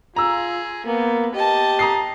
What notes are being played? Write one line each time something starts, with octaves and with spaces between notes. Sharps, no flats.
F4 G#4 A#5 E6
A#3 B3
G4 D#5 A5
A#5 D#6 C7